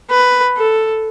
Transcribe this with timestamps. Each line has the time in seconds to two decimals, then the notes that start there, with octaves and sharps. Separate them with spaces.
0.10 B4
0.57 A4